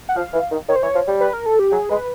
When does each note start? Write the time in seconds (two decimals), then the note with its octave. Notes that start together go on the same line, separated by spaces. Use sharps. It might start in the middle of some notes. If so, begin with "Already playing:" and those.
0.09 F#5
0.16 F3 F5
0.33 E3
0.51 D#3
0.68 D#3 C#5
0.76 C5
0.82 E3 C#5
0.95 F3
1.07 G3
1.21 B4
1.33 A#4
1.46 A4
1.59 G4
1.72 F#3 G#4
1.89 G#3 B4